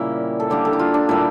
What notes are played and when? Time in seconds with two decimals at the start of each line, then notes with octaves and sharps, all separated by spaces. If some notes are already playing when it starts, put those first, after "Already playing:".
Already playing: A#2 C#3 G3 A#3 E4
0.40 A4
0.50 D3 G3 A#3 G4
0.65 A4
0.73 E4
0.79 F4
0.94 D4
1.09 A#2 G3 A#3 E4